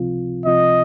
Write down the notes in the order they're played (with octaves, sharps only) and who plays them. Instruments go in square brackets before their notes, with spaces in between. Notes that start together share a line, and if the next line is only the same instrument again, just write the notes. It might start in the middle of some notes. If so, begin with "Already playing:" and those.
Already playing: [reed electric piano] C#2 C3 F3 C4 F4
[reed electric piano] C#2 C3 F3 C4 F4 [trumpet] D#5